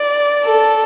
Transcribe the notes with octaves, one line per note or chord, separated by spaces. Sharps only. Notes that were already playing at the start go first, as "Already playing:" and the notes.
Already playing: D5
A4